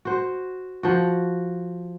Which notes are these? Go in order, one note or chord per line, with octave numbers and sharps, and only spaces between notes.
F#4 C5
F3 F#4